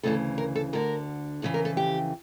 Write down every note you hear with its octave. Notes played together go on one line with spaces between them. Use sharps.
D2 C#3 E3 A4
A#4
A4
D2 D3 A#4
F2 C#3 E3 A4
A#4
A4
G4